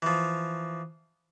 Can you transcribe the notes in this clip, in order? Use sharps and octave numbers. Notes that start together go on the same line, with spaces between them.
E3 F3